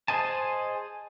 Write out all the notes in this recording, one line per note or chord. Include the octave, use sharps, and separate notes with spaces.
G#4 C5 D#5 G#5 A5